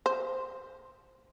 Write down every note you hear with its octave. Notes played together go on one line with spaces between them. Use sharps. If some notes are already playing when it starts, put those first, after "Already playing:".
C5